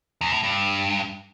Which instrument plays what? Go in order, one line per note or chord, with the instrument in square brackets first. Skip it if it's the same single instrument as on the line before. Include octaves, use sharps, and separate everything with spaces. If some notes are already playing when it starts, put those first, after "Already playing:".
[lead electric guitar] E2
A2
G2